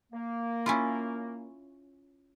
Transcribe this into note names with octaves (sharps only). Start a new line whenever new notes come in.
A#3
C#4 E4 F4